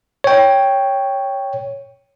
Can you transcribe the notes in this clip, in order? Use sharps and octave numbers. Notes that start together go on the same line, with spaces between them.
C#5 G5